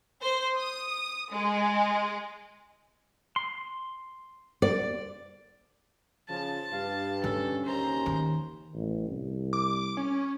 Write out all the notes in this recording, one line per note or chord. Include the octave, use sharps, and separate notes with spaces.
C5
D#6
G#3
C6
D5
C#3 F3 F4 A5
G2 F5
D3 C#4 A4
G#1 D#2 C5 A#5
D#3
A1
C2
D6
C#4